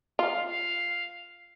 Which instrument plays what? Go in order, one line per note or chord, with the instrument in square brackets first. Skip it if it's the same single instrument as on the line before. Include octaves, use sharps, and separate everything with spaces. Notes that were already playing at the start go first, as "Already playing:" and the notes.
[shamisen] F4 [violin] F5
[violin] F5